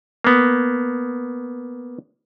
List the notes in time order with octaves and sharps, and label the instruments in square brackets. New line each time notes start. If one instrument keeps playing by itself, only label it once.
[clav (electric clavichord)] A#3 B3